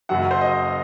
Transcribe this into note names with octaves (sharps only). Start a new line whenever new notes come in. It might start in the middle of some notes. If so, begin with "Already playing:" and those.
F#1 F#2 F#3 F#5
C5
D#5